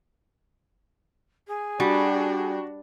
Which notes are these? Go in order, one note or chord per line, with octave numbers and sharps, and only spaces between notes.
G#4
G3 D4 F#4